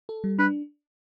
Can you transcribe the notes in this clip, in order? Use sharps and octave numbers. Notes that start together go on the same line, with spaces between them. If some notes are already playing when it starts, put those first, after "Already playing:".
A4
G3
D4 B4